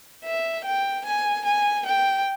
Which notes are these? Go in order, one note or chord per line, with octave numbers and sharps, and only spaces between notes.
E5
G5
G#5
G#5
G5